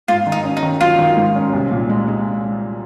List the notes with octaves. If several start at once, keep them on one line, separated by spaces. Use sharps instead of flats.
G#2 F4
D#3
D#4
C#4
D#4
D#3
F#3 F4
D#3
G#2
C#4
C2
A#2
G#3
G#3